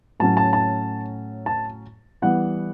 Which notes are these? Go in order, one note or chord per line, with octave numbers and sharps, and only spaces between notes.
A2 F#3 C#4 A5
A5
A5
A5
E3 G3 B3 F#5